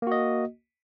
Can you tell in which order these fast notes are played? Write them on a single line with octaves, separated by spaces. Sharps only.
A#3 F#4 D#5